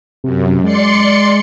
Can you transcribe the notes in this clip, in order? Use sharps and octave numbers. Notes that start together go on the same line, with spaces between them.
F#2 C3
G#3 D5 C6 C#7